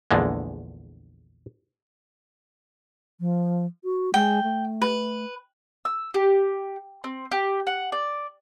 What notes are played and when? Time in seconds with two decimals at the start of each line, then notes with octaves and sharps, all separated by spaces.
0.11 A#1 E2 D3 G#3
3.20 F3
3.84 F#4
4.14 G#3 G5
4.43 A3
4.82 B4
5.85 E6
6.14 G4
7.04 C4
7.32 G4
7.67 F#5
7.92 D5